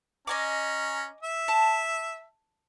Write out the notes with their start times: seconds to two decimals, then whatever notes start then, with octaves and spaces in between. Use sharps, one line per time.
0.27 C#4 D#5 G#5 A#5 D6
1.23 E5
1.48 A5